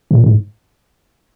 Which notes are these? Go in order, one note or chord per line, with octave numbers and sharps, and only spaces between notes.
A#2
G#2